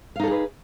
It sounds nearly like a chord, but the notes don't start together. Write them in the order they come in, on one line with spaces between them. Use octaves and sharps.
F5 D#4 A4 G#4 B4